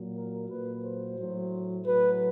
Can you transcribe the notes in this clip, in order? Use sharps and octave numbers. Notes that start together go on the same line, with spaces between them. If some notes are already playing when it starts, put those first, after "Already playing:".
Already playing: A#2 F#3
A#4
A#2 F#3 B4
C5
A2 F#3
A2 F#3 B4